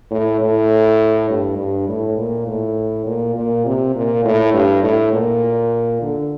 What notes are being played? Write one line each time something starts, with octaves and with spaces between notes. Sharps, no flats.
A2
A2
G2
G2
A2
A#2
A2
A#2
A#2
C3
A#2
A2
G2
A2
A#2
D3